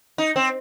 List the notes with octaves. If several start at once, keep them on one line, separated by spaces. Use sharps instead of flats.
D#4
C4